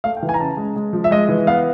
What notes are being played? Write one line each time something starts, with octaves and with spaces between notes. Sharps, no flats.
A3 F5
G5
E3
G#5
A#5
C#3 A5
G#3
G#3
F3
E5
G#3 D#5
E3
B3 F5